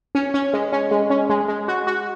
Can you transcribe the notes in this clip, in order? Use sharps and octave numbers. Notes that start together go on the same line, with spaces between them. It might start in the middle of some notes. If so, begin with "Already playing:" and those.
C#4
C#4
G#3
C#4
G#3
C#4
G#3
G#3
F#4
F#4